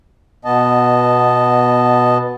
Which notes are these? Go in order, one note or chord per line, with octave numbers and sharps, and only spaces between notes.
B2 B3 D#5 A5